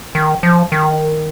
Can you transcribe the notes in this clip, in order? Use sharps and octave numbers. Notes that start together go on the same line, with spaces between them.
D#3
F3
D#3